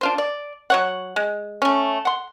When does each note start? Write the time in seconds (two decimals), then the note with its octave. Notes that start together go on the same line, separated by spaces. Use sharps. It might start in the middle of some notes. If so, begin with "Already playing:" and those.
0.01 D4 F4 C5
0.18 D5
0.70 F#3 C#5 F#5
1.16 G#3
1.62 A3 C#4
2.05 F#5 C6